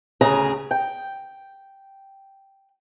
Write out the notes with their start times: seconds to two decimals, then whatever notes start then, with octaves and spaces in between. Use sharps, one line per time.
0.21 D2 C#3 G#4 A#5
0.71 G5